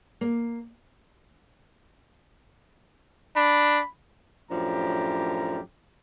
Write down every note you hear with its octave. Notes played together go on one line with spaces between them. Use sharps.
A#3
D4 B5
F#2 A2 F3 D4 G4 A#5